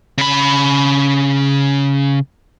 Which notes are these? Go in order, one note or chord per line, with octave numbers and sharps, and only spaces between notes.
C#3 B5